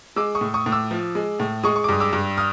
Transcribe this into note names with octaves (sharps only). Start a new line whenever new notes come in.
G#3 D6 E6
C#6 D#6
A2
C#6 D#6
A2
D6 E6
F3
G#3
A2
G#3 C#6 D#6
C#6
D6
G2 D#6
D6 E6
G2
D#6 F6